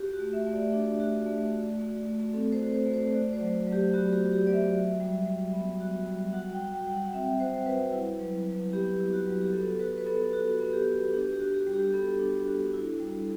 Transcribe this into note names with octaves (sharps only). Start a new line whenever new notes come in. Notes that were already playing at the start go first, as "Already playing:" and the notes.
Already playing: F#4 G4
F#4
A3
E5
A3 E5
D5
D4
F#4
A3
F#4
A3
A3
C4 A4
C5
F#4
C5
A3
C5
F#4 D5
C5
F#3
F#3
G4
B3 F#4
G4
F#4
G4
F#3 D5
E5
F#4
G3
G3
B3
F#4
G3
F#4 F#5
G5
G3
G5
G3
F#5
C4 E5
F#4 C5
G3 B4
E4
F#3
F#3
B3 G4
E4
F#4
F#3
G4
B3 A4
F#4 B4
B4
B3 A4
F#4
B3
G4
F#4
D4 G4
G4
F#4
G4
G3
G4
G4
B3 A4
D4
F#4
E4
G3